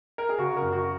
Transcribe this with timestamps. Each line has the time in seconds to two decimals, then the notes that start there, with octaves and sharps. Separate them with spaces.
0.18 A#4
0.29 G#4
0.38 C#3 F#4
0.57 A#4
0.62 F#2
0.73 F#4